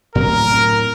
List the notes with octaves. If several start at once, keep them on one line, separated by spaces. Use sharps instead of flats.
A2 F#3 C4 A#4